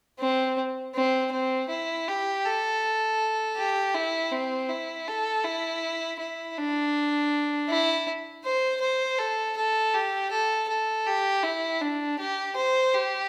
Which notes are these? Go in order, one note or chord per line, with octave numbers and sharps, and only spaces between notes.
C4
C4
C4
E4
G4
A4
G4
E4
C4
E4
A4
E4
E4
D4
E4
C5
C5
A4
A4
G4
A4
A4
G4
E4
D4
G4
C5
G4